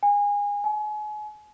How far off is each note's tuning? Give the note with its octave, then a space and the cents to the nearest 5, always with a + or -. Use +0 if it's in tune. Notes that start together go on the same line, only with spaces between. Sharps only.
G#5 -25
G#5 +35